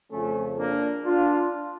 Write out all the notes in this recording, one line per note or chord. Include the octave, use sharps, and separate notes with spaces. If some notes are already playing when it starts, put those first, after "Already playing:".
F2 C#3 F3 A3 C#4
A#3 D4
D4 F4